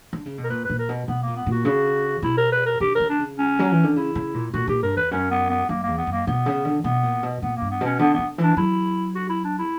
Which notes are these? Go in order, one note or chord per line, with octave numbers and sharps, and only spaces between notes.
D3
C#3
B2
A#4
A#2 B4
A#2 B4
A#4
B2
B2 B3
A#3
A#2
B3
A#2
F#4
C#3 F#4
B2 E4
A#4
B4
A#4
D3 G4
A#4
D3
D4
C#3
C#4
F#3
E3
D3
C#3 E4
C#3
A#2
A#2 F#4
A#2 G4
G2 A#4
E2 B4
F#2 C#4
B3
B3
F#2 A#3
E2 A#3
B3
F#2
A#3
B2 B3
C#3
D3
B2 B3
A#2
B2
A#2 B3
A#3
G2
B3
B2 C#4
D3 B3
D3 B3
E3
D4
F#3 E4
F#4
E4
D4
E4